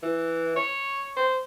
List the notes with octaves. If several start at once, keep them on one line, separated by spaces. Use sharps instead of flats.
E3
C#5
C5